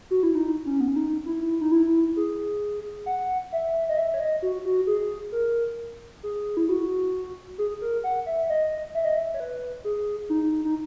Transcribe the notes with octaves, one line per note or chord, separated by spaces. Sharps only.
F#4
E4
D#4
C#4
B3
C#4
D#4
E4
D#4
E4
G#4
F#5
E5
D#5
E5
C#5
D#5
F#4
F#4
G#4
A#4
G#4
E4
F#4
G#4
A#4
F#5
E5
D#5
E5
D#5
E5
C#5
B4
G#4
D#4
D#4